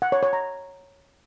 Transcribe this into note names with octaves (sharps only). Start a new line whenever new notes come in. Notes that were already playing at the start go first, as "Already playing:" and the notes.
F#5
C#5
C#5
A#5